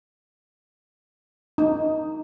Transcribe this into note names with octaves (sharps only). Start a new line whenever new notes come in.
D#4